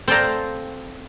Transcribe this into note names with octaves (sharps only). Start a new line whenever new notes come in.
C4 A4 C5 D5 F5 A#5